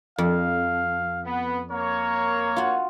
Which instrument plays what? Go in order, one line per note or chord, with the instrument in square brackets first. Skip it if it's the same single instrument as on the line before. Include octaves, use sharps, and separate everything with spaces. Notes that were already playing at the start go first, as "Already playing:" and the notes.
[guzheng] F2 [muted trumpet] F5
[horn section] B3
[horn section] A#3 C#5 [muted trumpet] A#4
[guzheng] F4 F#4